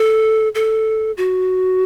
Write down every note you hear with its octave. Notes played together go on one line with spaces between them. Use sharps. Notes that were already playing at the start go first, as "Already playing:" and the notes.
Already playing: A4
A4
F#4